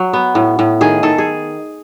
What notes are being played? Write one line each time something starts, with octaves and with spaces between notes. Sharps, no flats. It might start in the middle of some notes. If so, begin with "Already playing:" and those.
Already playing: F#3
B3
A2
A2
D#3 G#4
D#3 A4
G#4